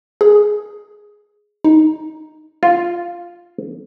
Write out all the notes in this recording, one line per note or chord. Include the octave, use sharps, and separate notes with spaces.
G#4
D#4
F4